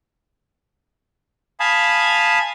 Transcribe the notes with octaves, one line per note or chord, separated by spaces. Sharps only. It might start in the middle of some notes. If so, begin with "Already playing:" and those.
F5 G#5 A5 B5 D#6